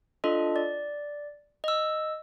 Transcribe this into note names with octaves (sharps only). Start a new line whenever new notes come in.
D4 F4 A4 D#5
D5
D#5 E6